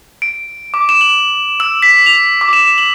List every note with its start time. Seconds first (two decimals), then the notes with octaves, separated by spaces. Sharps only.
0.22 D7
0.74 D6
0.89 E7
1.01 F#7
1.60 E6
1.82 B6
2.06 F7
2.41 D6
2.53 E7
2.78 F#7